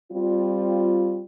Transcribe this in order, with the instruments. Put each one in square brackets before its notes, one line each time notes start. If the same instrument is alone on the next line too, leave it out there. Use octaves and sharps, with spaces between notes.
[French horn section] G3 C4 F4